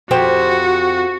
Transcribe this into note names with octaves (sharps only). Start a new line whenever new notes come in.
F2 F#4 G4 C5